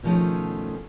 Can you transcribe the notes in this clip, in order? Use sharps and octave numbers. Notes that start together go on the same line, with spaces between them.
B2 D#3 F3 A3 C#4 G#4